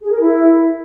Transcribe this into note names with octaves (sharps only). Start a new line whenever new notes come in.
G#4
A#4
E4